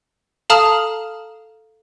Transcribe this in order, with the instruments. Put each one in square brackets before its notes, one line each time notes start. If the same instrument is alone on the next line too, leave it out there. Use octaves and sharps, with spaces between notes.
[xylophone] A4 F5 A5 A#5 D#6 F6